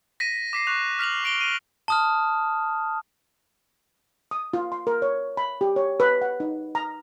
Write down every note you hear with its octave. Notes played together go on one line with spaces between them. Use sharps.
A#6 B6 D#7
D6 B6 C7
C#6 F#6 F7
F6 B6 F7 F#7
D6 D7 F7 G7
D#7 F7
A5 D#6 F6
D#6
F4
C6
A#4
C#5
B5
G4
C#5
B4
F#5
D#4
A#5